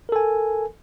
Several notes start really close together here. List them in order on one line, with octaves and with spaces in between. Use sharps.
A#4 A4 G#5